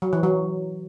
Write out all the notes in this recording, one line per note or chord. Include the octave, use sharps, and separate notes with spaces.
F#3
E3
F#3